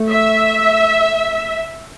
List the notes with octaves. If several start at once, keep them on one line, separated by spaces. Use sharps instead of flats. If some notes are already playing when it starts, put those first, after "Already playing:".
Already playing: A3
E5